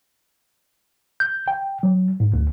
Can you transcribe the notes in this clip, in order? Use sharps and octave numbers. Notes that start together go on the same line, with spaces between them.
G6
G5
F#3
G#2
D2